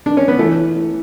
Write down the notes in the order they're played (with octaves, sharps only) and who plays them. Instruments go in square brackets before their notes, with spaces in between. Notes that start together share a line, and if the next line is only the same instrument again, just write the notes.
[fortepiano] D4
C#4
B3
[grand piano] E3 [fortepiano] A3